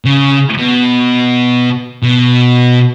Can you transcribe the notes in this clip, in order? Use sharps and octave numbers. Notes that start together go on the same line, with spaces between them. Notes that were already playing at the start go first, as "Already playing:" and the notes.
C#3
B2
B2